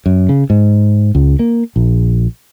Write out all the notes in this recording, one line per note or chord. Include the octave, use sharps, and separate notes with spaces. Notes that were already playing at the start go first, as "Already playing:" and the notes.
F#2
C#3
G#2
C#2
A#3
A#1